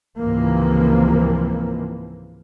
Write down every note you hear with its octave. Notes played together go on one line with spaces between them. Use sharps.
C#2 G#2 C3 E3 F3 A#3